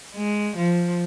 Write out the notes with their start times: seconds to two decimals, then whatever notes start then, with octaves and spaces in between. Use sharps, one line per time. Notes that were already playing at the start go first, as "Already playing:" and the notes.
0.15 G#3
0.56 F3